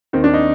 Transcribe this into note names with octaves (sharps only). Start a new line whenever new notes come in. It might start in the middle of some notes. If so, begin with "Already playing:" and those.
D#2 D#3 C4
D4
D#4